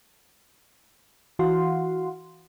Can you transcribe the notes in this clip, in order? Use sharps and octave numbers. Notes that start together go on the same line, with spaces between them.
E3 F#4 F5 F#5 C6